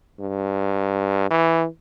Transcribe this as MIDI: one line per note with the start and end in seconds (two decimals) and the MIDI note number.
0.20 1.28 43
1.31 1.66 52